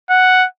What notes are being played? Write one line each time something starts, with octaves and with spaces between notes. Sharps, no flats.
F#5